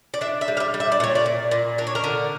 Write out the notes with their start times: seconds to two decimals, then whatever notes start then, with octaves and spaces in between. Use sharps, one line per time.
0.14 D5
0.21 D4 E5
0.41 E5
0.48 G3
0.57 F5
0.60 E5
0.74 G3
0.80 E5
0.92 D5
1.00 A#2 C#5
1.15 D5
1.26 A#2
1.51 A#2
1.78 D4 A#4
1.87 C#5
1.95 A#4
2.04 D3